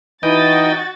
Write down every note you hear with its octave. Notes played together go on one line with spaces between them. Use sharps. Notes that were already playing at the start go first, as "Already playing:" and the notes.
E3 D#4 F#4 D#5 G5 A6